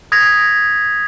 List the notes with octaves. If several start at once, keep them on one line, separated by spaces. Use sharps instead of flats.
D#6 G#6 A#6 B6 F7